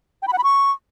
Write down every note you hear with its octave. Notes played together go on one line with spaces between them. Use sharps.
G5
B5
F#5
B5
C#6